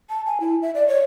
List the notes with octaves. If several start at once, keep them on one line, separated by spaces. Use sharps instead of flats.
A5
G#5
E4
E5
D5
C#5